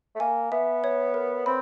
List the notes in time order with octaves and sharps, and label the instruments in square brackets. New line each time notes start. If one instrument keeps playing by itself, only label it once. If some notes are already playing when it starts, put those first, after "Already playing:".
[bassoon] A3
[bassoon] A#3 [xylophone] G#5
[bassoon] B3 [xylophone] E5
[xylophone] C#5
A#4
[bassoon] C4 [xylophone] B5